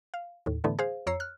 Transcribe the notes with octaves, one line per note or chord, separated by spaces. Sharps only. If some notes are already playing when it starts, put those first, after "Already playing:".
F5
D#2 A2
A2 D3 E3 A3 B3
G#4 C5 F5
F2 C#5 A#5 E6 C7 C#7
F6 F#6